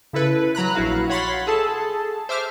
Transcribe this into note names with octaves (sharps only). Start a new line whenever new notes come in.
C#3 E4 A4 B4
F#3 A#5 B5 F#6
A#1 E4 F#4 F5
C#5 F#5 B5 C6 A6 B6
G#4 A4 A5
C5 E5 D6 F6